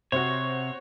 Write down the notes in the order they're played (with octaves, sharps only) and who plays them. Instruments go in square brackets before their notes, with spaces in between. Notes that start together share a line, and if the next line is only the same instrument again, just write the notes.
[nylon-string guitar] C3 [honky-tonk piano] F#4 C5 [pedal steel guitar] C#5